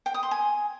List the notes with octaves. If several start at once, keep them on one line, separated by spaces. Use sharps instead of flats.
G5
D#6
C6
G#5